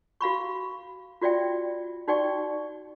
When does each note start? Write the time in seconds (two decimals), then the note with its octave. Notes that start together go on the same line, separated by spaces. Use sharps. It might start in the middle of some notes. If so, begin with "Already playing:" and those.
0.21 F#4 F5 B5 C#6
1.21 F4 F#4 D5 E5 G5
2.08 D#4 F#4 D5 G5 C#6